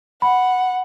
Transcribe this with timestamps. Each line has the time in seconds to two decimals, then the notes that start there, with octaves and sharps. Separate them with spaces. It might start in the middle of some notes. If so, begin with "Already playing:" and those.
0.22 F#5 B5